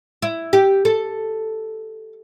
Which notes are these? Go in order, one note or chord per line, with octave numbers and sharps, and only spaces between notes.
E4
G4
A4